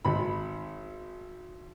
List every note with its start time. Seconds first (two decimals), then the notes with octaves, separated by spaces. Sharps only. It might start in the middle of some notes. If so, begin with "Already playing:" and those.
0.05 G#1 B5